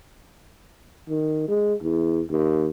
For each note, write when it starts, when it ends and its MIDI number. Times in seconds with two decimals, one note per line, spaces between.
1.08 1.48 51
1.48 1.74 56
1.82 2.21 40
2.30 2.70 39